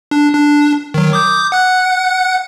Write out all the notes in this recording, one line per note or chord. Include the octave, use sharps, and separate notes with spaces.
D4
D4
D#3 F#3
D6 D#6 G6
F#5 F#6